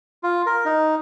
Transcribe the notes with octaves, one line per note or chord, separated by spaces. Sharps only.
F4
A#4
D#4